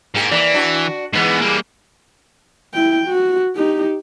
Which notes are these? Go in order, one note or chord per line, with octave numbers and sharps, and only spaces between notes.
G#2 A#3 G4
E3 A#3 D5
D4 F#4
G#2 E3 G#3 B3
G3 A#3
E4 G5
F#4
D#4 G4